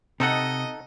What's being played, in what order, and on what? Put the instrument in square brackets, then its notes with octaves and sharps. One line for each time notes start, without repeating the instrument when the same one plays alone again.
[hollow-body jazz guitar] C3 [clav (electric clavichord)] D#4 A4 F#5 [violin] D#5